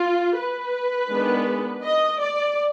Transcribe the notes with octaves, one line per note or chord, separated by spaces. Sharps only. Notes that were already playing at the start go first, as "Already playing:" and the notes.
Already playing: F4
B4
D#3 G#3 B3 D4
D#5
D5